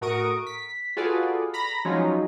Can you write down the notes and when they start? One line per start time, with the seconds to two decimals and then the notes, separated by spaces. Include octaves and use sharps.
0.01 A2 F#4 A#4 C#6 D#6 D7
0.47 B6
0.97 F4 F#4 G#4 A4 B4 D5
1.54 A#5 B5 A#6 B6
1.85 F3 F#3 G#3 C#4 D#4 F4